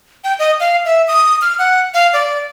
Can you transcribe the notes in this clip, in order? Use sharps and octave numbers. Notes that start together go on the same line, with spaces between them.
G5
D#5
F5
E5
D#6
F6
F#5
F5
D5